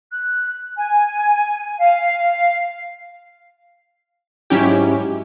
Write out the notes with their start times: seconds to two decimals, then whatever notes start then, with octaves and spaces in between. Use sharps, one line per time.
0.13 F#6
0.77 G#5
1.80 F5
2.20 F5
4.50 G#2 F#3 C#4 E4 G4